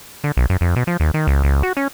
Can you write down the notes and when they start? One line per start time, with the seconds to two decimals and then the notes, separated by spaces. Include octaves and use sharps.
0.24 D3
0.37 B1
0.50 F#2
0.61 F2
0.76 B2
0.87 F3
1.00 D#2
1.14 D#3
1.27 C#2
1.44 C#2
1.63 F#4
1.77 C#4